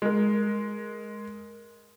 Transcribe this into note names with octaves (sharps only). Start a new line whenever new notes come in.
G#3 A#4